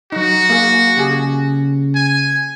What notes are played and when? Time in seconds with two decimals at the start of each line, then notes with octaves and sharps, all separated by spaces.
0.12 F#3 D#4 F#4
0.50 A#3 G#4
0.97 C#3 G4 G#4
1.95 G#5